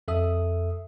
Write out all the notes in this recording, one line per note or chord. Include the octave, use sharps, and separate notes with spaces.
F2 A4 E5 D#6